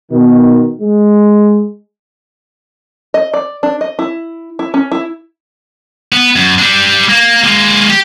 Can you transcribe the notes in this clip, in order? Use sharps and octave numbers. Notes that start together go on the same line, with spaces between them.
B2 D#3
G#3
D#5
D5
D4
D#5
E4
E4
C#4
E4
B3
F#2
G3 D4
A#3
G#3 A#3
G4